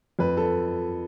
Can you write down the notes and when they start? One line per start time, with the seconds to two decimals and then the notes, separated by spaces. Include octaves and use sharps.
0.19 F2 B4
0.37 A4